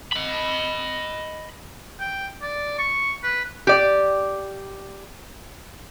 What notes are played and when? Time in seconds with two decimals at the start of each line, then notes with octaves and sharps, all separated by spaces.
0.13 D#5 B5
2.00 G5
2.42 D5
2.79 C#6
3.23 B4
3.67 G4 D5